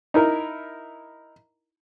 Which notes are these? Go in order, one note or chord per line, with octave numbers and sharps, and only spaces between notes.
D#4 E4 A#4